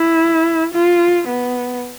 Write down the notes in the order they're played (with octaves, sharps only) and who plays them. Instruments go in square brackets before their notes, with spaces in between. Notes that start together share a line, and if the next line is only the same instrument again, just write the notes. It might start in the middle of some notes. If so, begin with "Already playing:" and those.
Already playing: [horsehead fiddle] E4
F4
B3